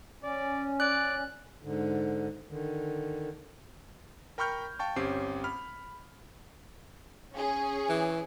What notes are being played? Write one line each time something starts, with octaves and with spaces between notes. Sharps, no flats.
C#4 D5
D5 F#6
G#2 D3
D3 D#3
A#4 G5 B5 C#6 F6 G6
F5 G5 A5 C#6
G1 C4 C#4 G4 C7
B5 F6
C#4 G#4
E3